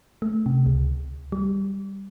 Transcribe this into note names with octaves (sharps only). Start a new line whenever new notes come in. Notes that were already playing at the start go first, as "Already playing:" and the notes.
A3
C3
C#2
G3